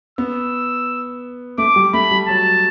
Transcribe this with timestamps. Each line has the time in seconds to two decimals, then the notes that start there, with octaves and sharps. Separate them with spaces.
0.18 B3 E6
1.58 A3 D6
1.76 G3
1.94 A3 B5
2.11 G3
2.28 F#3 A5